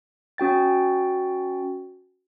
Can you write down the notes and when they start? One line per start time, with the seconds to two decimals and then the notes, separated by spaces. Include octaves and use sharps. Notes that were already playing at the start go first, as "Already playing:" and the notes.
0.38 C#4 F#4 G5 A6